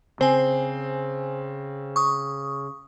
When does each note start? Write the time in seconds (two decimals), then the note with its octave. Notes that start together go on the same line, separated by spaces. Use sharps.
0.21 C#3 C4 C5 G#5
1.96 C#6 D#6